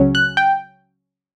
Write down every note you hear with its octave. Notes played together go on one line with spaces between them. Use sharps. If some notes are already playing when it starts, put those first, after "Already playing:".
Already playing: C#2 C#3 F#3 C#4
F#6
G5